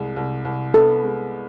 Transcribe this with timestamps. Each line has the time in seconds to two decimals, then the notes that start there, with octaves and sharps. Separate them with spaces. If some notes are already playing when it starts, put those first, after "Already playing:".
Already playing: C2 C3 G#3
0.16 C2
0.45 C2
0.74 B3 A4
1.03 G#3